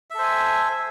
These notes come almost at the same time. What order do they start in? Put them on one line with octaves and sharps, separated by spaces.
E5 A4 C5 G#5